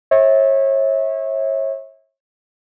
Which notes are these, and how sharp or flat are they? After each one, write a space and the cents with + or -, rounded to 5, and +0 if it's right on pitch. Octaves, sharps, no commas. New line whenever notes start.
C#5 -35 E5 -30